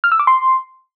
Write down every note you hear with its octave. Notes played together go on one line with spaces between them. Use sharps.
F6
E6
D6
C6